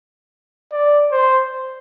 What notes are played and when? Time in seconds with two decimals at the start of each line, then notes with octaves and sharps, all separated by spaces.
0.72 D5
1.12 C5